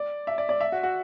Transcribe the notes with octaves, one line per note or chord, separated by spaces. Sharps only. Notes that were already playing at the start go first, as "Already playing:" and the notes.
Already playing: D5
E5
D5
D5
E5
F#4
F#4